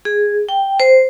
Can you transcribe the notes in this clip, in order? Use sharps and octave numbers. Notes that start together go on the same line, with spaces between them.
G#4
G5
C5